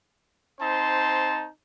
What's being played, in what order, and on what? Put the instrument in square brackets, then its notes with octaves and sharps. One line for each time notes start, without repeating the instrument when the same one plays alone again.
[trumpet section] C4 D#4 C5 A5